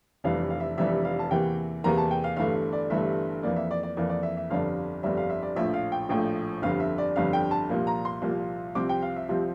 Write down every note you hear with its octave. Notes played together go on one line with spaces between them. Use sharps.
F1 F2 E3 G3 D4 F5
F5
E5
F1 F2 E3 G3 D4 E5
F5
A5
E2 C3 E3 A#3 G5
E2 C3 E3 A#3 A#5
A5
G5
F5
G1 G2 E3 A3 F5
D5
G1 G2 E3 A3 E5
F2 E3 A#3 D5
E5
D5
D5
F2 E3 A#3 D5
D5
E5
E5
G1 F2 D3 G3 D4 F5
G1 F2 D3 G3 D4 E5
F5
E5
D5
A#1 A2 F3 E5
F5
G5
A#1 A2 F3 G5
G1 F2 D3 G3 F5
E5
D5
G1 F2 D3 G3 F5
G5
A5
C2 A#2 F3 A#3
A#5
C6
C2 A#2 F3 A#3
C2 C3 F3 C4 D6
G5
F5
E5
C2 C3 F3 C4 E5